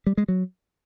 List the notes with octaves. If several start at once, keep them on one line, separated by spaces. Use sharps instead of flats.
G3
G#3
F#3